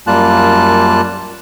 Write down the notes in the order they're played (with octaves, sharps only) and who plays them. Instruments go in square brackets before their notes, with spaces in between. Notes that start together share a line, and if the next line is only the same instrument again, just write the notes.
[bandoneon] F#2 G3 A#3 F4 A5 F#6